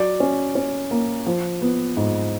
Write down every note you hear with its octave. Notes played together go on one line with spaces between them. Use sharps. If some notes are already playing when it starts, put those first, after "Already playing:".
Already playing: F#3 D5
C#4
C#4
A#3
F3
B3
G#2